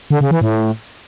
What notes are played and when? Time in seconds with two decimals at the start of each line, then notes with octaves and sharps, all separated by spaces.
0.10 D3
0.21 C#3
0.31 E3
0.41 A2